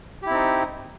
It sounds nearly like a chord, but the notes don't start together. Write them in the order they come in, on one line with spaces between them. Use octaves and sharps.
G4 E4 C4 D#4